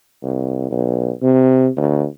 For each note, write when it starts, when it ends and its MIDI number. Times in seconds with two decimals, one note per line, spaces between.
0.23 0.69 36
0.71 1.11 35
1.22 1.68 48
1.77 2.05 38